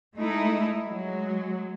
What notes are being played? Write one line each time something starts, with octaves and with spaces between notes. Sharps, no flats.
G#3 A3 D#4 E4
F#3 G#3